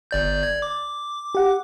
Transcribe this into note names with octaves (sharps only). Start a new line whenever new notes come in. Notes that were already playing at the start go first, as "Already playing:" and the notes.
G1 D5 G6
D5 G#6
D6
G4 F#5